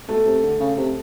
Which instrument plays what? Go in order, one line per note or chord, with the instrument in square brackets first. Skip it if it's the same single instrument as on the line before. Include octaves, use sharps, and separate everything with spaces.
[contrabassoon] B2 [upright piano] A3
[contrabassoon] C3
D3
C#3
C3